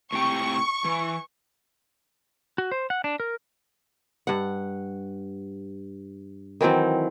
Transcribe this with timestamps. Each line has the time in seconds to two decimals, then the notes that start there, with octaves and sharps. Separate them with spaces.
0.12 A2 C3 G5 C#6
0.85 E3
2.58 F#4
2.72 C5
2.90 F#5
3.04 D4
3.20 A#4
4.27 G2 F#5
6.61 D#3 E3 F#3 C4